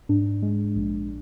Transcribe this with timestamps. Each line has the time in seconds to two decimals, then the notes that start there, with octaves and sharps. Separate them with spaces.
0.09 G#2 D4
0.42 G#3
0.76 A#1